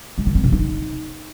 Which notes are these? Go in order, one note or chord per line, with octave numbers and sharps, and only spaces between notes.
G#3
D#3
C4
C3
D#4